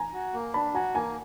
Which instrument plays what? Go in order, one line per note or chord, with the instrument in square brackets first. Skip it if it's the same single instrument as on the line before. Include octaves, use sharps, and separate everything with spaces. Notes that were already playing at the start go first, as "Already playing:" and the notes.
Already playing: [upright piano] G#5 A#5
[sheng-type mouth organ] F#4
A#3
[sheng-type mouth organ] D4 [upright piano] A5 B5
[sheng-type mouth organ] F#4 [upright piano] G#5 A#5
[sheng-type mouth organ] A#3 [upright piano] G#5 A#5